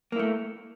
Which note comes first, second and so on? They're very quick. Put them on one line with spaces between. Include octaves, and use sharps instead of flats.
A#3 E4 A3